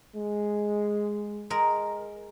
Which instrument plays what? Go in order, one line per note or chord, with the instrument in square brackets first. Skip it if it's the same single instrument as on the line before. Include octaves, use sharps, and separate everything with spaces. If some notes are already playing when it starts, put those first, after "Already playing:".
[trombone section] G#3
[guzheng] G#3 A#4